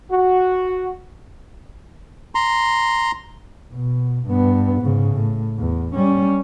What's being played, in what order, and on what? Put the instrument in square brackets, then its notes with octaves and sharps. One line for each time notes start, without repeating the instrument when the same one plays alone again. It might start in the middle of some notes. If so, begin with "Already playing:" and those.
[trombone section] F#4
[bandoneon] A#5 C6
[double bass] B2
G2 B3
G#2 C#3
A2
E2
G3 C#4